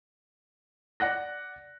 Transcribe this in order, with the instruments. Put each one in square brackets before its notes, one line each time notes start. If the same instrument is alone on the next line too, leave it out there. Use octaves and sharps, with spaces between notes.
[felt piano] D5 F#5 F#6 A#6